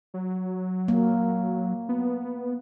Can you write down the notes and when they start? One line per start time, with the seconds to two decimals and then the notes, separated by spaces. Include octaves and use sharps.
0.14 F#3
0.88 A#3
1.89 B3